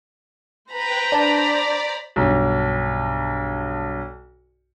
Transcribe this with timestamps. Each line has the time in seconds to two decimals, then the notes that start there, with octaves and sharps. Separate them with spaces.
0.70 B4 C5 G5 A#5 B5
1.12 D4 D5 A5
2.16 B1 G2